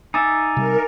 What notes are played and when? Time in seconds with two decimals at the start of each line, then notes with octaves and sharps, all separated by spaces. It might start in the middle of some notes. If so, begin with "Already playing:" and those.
0.14 D#4 E5 G#5 D6 A6
0.57 C3 G3 A#4